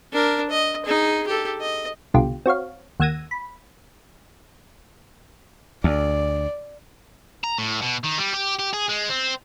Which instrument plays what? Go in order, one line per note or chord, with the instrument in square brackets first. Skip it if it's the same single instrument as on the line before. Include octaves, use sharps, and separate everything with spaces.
[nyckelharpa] D4 A#4
D#5
D#4 G#4
G4 A4
D#5
[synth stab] C2 B2 D3 F4 G4
C4 F#4 C#5 F5
D#2 F#5 E6 G#6 A#6 D#7
B5
[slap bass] D2 [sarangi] D5
[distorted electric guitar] A#5
A2
B2
D#3
G3
G4
G4
G#4
G#3
C4